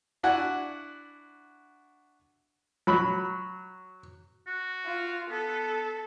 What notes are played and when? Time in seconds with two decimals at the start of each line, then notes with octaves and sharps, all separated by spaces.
0.23 D4 E4 F#4 D5 F#5 G#5
2.87 F#3 B5
4.47 F#4
4.85 F4
5.30 B3 A4